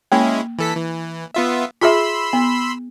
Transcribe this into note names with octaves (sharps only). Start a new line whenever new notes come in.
G#3 A#3 C#4 E4
E3 A4 B6
E3
B3 F4 E5
F4 G#4 E5 B5 C6 E6
B3